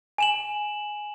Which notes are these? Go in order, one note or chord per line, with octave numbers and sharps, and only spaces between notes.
G#5 E7 F#7